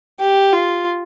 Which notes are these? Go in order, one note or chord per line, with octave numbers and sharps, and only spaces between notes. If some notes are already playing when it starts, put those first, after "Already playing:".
G4
F4